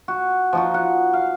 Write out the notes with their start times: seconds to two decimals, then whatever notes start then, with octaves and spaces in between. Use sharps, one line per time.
0.08 F#4
0.53 F3 D#4 F#4
0.74 F#5
1.13 F5